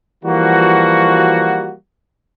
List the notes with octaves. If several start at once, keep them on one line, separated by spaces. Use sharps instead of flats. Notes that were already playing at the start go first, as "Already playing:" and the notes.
E3 F3 G3 A#3 F#4